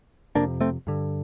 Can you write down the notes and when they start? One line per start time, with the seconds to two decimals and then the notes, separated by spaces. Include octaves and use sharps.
0.35 F2 C3 A#3 D4
0.61 A3 C4
0.87 G2 D3